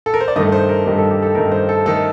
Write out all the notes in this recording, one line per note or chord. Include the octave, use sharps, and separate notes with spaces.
A4
A#4
C5
D5
G2 D#3 A3 D#5
C5
A#4
G2 D#3 A3 G4
A4
G4
A4
G2 D#3 A3 A#4
C5
A4
D#3 A3 A4